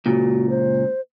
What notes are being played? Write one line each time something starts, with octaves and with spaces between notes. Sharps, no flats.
C#2 A#2 F#4
C5